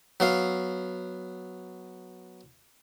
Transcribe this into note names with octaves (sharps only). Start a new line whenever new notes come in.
F#3 B3 F5